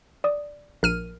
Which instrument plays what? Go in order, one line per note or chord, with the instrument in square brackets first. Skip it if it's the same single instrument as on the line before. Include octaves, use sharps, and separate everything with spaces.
[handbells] D5 D#6
[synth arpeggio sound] A#1 F6 D#7 [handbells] A#4